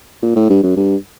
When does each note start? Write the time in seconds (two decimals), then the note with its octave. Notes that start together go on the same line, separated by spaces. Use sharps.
0.22 A#2
0.36 A2
0.50 G2
0.63 F#2
0.76 G2